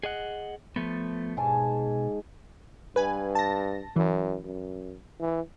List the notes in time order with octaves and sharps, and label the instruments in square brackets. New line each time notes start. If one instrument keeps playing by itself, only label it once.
[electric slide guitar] G#4 D#5 F#5
F3 A3 B3
[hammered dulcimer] G#2 G#5 A5 [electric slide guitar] B2
[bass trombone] G2 [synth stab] B4 G#5
[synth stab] A5 A#6
[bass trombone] F#2 [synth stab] E3
[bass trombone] F#2
E3